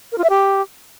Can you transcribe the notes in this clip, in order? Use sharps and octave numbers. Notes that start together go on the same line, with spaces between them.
A#4
F4
E5
G4